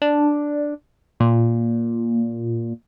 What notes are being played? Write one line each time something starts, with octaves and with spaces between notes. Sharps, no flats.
D4
A#2